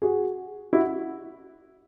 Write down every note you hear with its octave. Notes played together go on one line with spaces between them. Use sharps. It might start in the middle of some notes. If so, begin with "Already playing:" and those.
F#4 G#4
E4 F#4